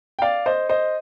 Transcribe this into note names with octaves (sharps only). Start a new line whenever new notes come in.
G5
D5 F5
C5 D#5
C5 D#5